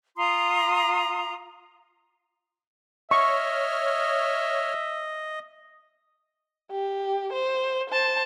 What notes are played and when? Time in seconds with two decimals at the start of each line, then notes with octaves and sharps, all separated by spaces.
0.16 F4 A#5 C6 D#6
3.11 C#5 D#5 E5 C#6 F6
6.71 G4
7.33 C5
7.89 C5 A5